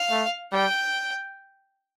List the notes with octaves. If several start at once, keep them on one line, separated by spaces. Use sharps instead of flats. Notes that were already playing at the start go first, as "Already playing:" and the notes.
Already playing: F5
A3
G3 G5